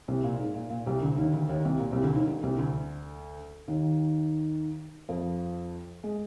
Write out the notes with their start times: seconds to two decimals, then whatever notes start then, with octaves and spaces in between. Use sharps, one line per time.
0.08 C2 C3
0.24 A#2
0.40 G#2
0.55 A#2
0.70 A#2
0.86 C2 C3
1.01 D2 D3
1.17 D#2 D#3
1.33 D2 D3
1.49 D#2 D#3
1.65 C2 C3
1.80 A#2
1.91 C2 C3
2.03 D2 D3
2.15 D#2 D#3
2.27 D2 D3
2.43 C2 C3
2.58 D2 D3
3.68 D#2 D#3
5.09 F2 F3
6.04 G#3